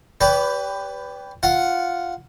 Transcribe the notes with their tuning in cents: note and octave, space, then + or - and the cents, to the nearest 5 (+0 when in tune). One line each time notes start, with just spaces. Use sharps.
G4 +5 B4 +15 D5 -40
F4 +0 F#5 +0